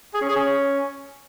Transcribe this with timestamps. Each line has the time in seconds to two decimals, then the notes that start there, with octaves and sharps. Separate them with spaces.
0.14 G#4
0.21 C#4
0.29 G#4
0.36 C#4